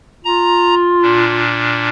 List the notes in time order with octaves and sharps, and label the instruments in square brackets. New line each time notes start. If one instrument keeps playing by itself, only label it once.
[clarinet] F4 [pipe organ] A#5
[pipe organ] A#2 D4